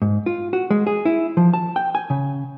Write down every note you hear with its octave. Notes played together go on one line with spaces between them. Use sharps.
G#2
F4
F#4
G#3
G#4
E4
F3
A5
G5
G#5
C#3